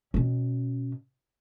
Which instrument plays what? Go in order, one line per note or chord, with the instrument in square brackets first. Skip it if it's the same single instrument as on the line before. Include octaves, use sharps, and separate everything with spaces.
[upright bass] B2 C#4